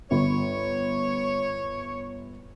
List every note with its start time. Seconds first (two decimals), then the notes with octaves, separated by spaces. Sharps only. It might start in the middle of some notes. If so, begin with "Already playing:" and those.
0.11 G1 C#5